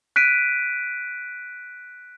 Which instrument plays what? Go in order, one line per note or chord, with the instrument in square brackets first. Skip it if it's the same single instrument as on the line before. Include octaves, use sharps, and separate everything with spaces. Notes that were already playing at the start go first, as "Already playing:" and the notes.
[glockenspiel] F#6 B6 D7 D#7